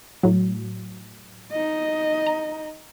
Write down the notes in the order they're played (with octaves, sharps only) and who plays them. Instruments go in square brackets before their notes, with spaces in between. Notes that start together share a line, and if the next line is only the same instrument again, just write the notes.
[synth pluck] A2 F#3
[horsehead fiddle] D#4 D#5
[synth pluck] A#5